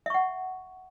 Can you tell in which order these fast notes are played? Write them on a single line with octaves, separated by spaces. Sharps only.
E5 C#6 F#5